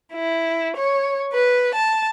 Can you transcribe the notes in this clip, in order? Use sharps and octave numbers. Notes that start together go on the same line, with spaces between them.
E4
C#5
B4
A5